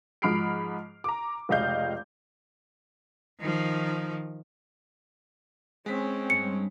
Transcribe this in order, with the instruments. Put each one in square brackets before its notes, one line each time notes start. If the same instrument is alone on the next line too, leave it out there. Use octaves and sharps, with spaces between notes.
[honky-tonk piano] G#2 F3 B5 F6 C7 D7
A#5 D6
F1 C#2 D#5 F5 G6
[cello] D#3 F3
[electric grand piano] G#3 B6 [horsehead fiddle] C4 C#4
[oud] G2 [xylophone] C#7